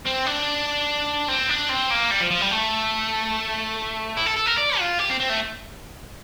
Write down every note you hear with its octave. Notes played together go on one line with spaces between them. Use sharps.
C4
D4
C4
D4
C4
A#3
G3
F3
F3
G3
A3
E4
A4
A4
A#4
D5
F4
G4
C4
C4
A3